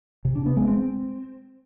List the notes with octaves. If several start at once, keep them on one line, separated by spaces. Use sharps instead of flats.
C3
D4
B3
G#3
C4